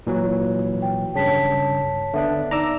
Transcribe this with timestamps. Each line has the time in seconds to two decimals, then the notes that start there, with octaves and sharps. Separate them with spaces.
0.07 A#2 E3 F#3
0.82 G5
1.15 G2 C#3 C#5 A5 B6
2.14 D3 B3 D4 E5
2.51 D#4 D5 A#5 D6 E6